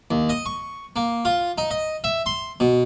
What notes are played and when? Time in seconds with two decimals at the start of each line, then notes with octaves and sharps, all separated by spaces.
0.11 D#2
0.29 D#5
0.46 C#6
0.96 A#3
1.25 F4
1.58 D#4
1.71 D#5
2.04 E5
2.26 C6
2.60 B2